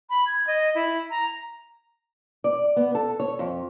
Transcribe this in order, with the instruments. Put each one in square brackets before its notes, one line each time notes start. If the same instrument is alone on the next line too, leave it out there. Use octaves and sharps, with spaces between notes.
[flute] B5
G#6
D#5
E4
A#5
[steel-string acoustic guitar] D5
B3
A4
C#5
F2